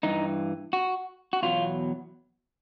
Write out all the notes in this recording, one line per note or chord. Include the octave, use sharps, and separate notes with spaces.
G2 E3 D#4
F#4
F#4
E2 B2 F#3 F4